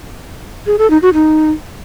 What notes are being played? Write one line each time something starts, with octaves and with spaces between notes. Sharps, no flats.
G#4
A4
D#4
F#4
D#4